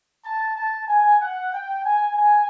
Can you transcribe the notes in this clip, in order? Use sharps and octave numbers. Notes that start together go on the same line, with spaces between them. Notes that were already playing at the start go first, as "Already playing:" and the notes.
A5
A5
G#5
F#5
G5
G#5
G#5